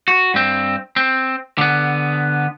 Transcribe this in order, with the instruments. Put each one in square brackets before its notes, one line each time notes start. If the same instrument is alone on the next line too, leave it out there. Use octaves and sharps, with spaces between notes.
[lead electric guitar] F#4
G2 C4
C4
D3 B3